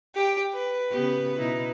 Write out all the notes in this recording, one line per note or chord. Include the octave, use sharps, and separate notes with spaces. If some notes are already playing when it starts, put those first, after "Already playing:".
G4 G5
B4
C#3 B3 G4
B2 D#4 E4